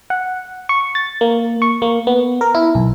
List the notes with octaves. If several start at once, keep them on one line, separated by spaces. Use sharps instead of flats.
F#5
C#6
A6
A#3
C#6
A#3
B3
A#4
E4
B1